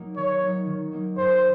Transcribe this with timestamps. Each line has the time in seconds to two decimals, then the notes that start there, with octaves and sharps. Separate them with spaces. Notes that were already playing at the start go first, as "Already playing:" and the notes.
Already playing: F#3 A#3 D#4
0.16 D#3 C#5
0.41 F#3 A#3 D#4
0.67 D#3
0.92 F#3 A#3 D#4
1.17 F#2 C5